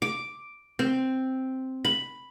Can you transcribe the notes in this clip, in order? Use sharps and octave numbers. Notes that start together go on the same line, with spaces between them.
D6
C4
B5